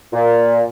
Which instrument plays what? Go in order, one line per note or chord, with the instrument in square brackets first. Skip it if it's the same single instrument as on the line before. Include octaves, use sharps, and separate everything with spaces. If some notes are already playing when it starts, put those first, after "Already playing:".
[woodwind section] A#2